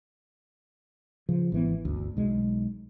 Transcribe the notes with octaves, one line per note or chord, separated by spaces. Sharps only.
C#3 F3
G#1 E3 B3
G1 D2
B1 G#3